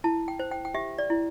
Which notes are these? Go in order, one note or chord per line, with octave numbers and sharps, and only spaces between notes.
E4 A5
G5
C5
G5
G5
G4 E5
D5
E4